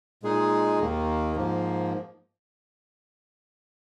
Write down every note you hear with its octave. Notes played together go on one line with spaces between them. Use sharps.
A#2 G#3 D#4 G#4
D#2 D#3 A#3
G#2 F3 A#3